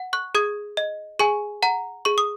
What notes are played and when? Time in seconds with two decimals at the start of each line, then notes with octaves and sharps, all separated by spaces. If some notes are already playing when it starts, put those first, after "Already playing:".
Already playing: F#5
0.13 C#6 F#6
0.35 G#4 D#6 G#6
0.77 D#5
1.19 G#4 G#5 C#6
1.63 F#5 A#5
2.05 G#4 C#6
2.18 D#6